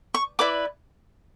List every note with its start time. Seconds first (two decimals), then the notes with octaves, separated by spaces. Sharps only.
0.14 C#6
0.39 E4 B4 D5 D6